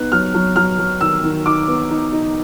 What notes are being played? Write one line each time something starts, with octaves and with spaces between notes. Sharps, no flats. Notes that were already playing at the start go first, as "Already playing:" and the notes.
Already playing: B3 D#4 F#6
F#3 F6
F#3
F#3 F6
F#3
D#3 E6
D#3
D#4 D6
B3
D#4
D#4